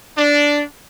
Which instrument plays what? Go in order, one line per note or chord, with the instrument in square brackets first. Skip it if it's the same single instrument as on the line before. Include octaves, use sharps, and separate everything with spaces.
[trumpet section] D4